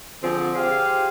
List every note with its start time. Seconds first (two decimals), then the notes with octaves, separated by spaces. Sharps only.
0.23 D3 F3 C4 G#4
0.55 G4 G#4 C5 F5